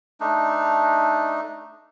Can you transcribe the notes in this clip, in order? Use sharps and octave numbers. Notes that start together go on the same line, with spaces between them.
A3 D4 D#4